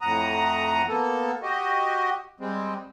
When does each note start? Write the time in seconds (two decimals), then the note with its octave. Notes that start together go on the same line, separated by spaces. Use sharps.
0.01 F2 A2 F#5 A#5 D#6
0.89 A#3 B3 A4
1.43 F#4 G4 D#5
2.40 G3 G#3 C4